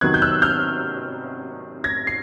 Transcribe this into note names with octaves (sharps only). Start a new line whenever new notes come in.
C3 D#3 F#3 B3 F#6 G#6
G6
E6 F#6
F6 G6
G#6 A#6
C7